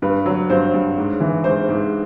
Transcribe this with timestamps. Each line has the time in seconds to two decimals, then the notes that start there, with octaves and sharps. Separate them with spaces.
0.02 G2 B4
0.26 F#3
0.50 G2 C5
0.74 G2
0.98 G#2
1.20 E3
1.44 G#2 C5
1.69 G#2